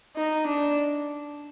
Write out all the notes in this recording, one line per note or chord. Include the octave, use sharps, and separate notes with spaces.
D#4
D4